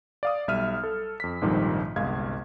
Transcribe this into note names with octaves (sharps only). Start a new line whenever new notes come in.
D5 F5 D#6
B1 G3 E5 F6 D#7
A4
F2 B6
A#1 F2 G#2 D#3 F3 G3
G1 C2 G#3 F5 G#6